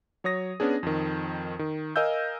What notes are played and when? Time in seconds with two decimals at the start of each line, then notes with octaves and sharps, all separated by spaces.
0.24 F#3 C#5 D#6 A#6
0.60 B3 C#4 D4 G#4
0.83 F2 D#3
1.59 D#3
1.96 A#4 D#5 F5 G#5 E6 G6